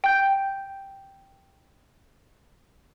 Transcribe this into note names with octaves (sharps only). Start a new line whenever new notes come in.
G5 G6